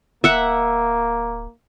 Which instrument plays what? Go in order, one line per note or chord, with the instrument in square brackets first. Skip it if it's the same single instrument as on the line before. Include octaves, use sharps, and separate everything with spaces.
[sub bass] D1 [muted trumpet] A#3 [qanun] E5 F#5